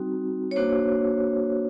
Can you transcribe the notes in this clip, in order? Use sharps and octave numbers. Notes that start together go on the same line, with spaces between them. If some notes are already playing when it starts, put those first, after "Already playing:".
Already playing: G3 C4 D#4 F#4
C#5
A#3 D4 F#4 C5